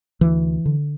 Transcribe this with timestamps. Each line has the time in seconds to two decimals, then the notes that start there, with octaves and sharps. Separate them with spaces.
0.21 D2 E3
0.66 D3